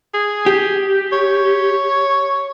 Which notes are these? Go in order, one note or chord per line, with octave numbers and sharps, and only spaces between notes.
G#4
G4
C#5